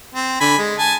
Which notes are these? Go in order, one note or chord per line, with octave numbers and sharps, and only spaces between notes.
C4
D3 G#5 B5
G#3
G#5 A5